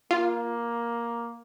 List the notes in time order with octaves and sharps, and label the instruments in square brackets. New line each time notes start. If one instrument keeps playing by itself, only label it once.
[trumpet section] A#3 [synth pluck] F4